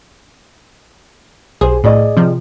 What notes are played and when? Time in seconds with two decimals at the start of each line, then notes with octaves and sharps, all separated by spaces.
1.61 B1 G4 G#4 C5
1.84 A2 G#4 D5 D#5
2.17 C3 F3